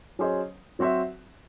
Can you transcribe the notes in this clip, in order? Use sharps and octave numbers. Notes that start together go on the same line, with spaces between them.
F#3 C#4 G#4 C5 D#5
F#3 C4 F#4 C5 E5